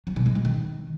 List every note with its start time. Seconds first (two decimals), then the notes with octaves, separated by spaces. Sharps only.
0.07 F#3
0.16 B2
0.26 G#3
0.35 B2
0.45 D#3